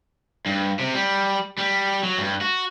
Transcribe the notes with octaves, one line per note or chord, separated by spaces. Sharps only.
G2
C3
G3
G3
F#3
G2
F#4